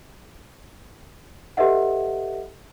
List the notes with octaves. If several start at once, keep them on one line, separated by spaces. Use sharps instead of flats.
G4 A4 B4 D#5 E5 F#5